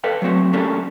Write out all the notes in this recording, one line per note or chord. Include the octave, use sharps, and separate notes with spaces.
A4 B4 D5 F5 G5
F#3 A3 C4 F#4
A3 A#3 C#4 D4 G4 A4